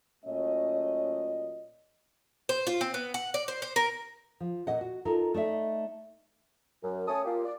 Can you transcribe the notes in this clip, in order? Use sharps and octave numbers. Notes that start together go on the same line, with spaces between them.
A#2 F#3 A3 C#4 D#5
C5
F4
C4
B3
F#5
D5
C5
C5
A#4
F3
A#2 D#5 F#5
F#4
D#4 F4 A4 A#4
A3 D#4 D5 E5
F#2
A3 C#4 C#5 G#5 A5 D#6
A#3 F4 G4
D5